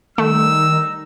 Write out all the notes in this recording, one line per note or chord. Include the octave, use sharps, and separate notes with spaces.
D#3 G3 A3 D#4 E6